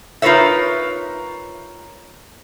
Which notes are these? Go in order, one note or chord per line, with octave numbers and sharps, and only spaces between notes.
D#4 F4 A#4 B4 C#5 E5